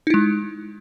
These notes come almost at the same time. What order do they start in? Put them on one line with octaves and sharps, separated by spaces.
D#4 E4 G#3